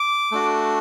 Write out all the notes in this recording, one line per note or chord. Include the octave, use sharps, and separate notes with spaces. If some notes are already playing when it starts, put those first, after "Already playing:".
Already playing: D6
A3 D4 F#4